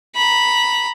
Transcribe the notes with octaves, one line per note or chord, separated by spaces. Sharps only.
A#5 B5